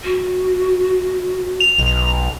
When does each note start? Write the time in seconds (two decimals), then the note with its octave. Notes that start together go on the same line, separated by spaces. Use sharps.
0.04 F#4
1.60 F7
1.78 B1